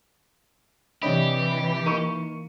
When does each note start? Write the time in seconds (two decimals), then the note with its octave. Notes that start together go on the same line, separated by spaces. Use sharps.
1.02 C3 E3 D4 G4 C#5 D#5 B5
1.86 A#3 D#4 A#4 C#6 D#7